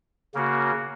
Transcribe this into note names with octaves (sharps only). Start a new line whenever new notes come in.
C#3 A#3 F#4